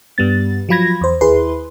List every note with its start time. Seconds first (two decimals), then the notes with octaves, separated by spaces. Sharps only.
0.18 G2 G3 B3 A6
0.69 F3 F#3 F4 B5 G#6 A#6
1.01 E2 C5
1.21 D#2 E4 G#4 B4 C6